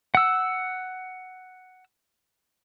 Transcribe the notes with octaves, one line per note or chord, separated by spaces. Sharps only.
F#5 E6